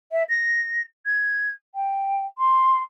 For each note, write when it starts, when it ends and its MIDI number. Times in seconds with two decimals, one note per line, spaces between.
0.12 0.23 76
0.29 0.82 94
1.06 1.50 92
1.75 2.26 79
2.38 2.81 84